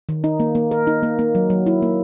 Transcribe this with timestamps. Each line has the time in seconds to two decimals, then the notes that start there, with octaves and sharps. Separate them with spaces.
0.09 D#3
0.24 D#4
0.40 A#3
0.55 A#3
0.71 A#4
0.87 D#4
1.03 A#3
1.19 A#3
1.35 F#3
1.50 F#3
1.66 E4
1.82 A#3